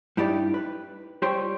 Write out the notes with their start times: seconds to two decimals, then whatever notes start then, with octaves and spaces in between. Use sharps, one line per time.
0.17 G2 D#4 E4 G4 D5
0.54 B4
1.22 G3 F4 C5 C#5 G5 C6